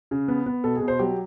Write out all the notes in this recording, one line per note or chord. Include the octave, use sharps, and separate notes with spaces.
C#3
B3
B3
B2 A4
G#4
B2
C5
F#3 G4